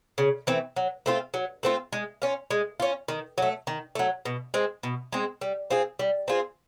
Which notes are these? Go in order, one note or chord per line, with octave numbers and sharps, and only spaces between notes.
C#3
E3 A3 C4
F#3
A3 C4 F4
F#3
A3 C4 F4
G#3
C#4 F4
G#3
C#4 F4
D#3
F#3 A3
D#3
F#3 A3
B2
G#3 C4
B2
G#3 C4
G3
C4 F4 G#4
G3
C4 F4 G#4